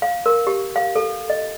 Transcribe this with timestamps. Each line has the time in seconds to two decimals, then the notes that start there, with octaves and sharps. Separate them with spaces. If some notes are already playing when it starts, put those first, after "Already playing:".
0.02 F5
0.26 A#4
0.47 G4
0.76 F5
0.96 A4
1.30 D#5